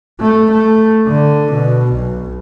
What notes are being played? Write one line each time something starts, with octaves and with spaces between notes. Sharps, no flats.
A3
A3
D3
B2
B1